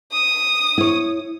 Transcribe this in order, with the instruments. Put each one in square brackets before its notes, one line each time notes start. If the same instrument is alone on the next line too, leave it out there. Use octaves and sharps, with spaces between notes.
[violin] D#6
[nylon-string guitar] E4 C#5